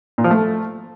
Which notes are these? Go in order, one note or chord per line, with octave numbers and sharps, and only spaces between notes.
A#2
F3
A3